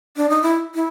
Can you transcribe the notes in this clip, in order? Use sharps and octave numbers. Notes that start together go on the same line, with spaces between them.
D4
D#4
E4
E4